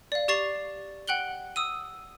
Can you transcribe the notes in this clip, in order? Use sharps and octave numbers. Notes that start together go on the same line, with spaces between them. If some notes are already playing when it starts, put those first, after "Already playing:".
D5 F5
G4 D5 C#6 A6 C7 F7
F#5 G5 F#6 F#7 G7
D#6 E6 D#7